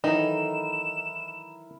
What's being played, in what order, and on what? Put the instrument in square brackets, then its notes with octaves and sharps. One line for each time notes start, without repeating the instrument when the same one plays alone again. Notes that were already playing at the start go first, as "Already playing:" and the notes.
[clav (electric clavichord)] D#3 E3 F#3 [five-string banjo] D#4 [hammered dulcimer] E4 A4 A#4 [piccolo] E7